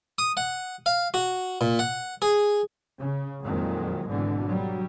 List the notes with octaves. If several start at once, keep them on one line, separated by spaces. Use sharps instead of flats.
D#6
F#5
F5
F#4
A#2
F#5
G#4
C#3
F2 A#2 D#3 F#3 G#3
G#1 B2 D3 E3
F#3 G3